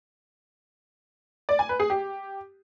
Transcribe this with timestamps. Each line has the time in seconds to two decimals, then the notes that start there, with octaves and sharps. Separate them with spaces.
1.49 D5
1.59 G#5
1.69 B4
1.80 G#4
1.90 G4